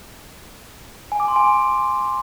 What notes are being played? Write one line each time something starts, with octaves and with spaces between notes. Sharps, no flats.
G#5
D6
C6
G#5